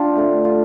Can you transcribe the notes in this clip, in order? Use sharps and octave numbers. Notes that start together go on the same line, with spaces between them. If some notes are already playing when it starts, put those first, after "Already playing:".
Already playing: D4 F4 G4
D3 A3 C4
F4